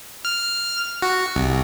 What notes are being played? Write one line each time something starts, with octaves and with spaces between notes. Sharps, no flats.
F6
F#4
C2